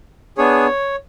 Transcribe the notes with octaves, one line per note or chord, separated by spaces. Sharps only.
B3 D4 G#4 C#5